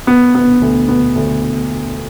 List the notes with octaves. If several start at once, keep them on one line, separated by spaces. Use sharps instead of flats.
B3
B3
D2
B3
D2